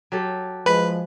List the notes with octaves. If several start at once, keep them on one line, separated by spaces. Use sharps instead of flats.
F#3 G4 A4
F3 G#3 B4 B5